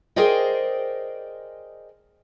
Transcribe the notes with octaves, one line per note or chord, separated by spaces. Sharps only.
G#4 A#4 C5 D5 D#5 G5